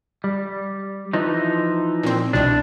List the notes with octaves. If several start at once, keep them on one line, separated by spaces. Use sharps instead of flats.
G3
E3 F3 D#4
A#2 C4
C2 B2 D4